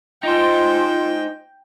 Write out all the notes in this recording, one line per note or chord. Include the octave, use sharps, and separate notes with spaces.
D#4 F4 C5 G5